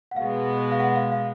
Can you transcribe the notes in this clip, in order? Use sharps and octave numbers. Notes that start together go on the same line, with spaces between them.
F#5
B2 G#3 B3 F5
F5
F#5
F5
F5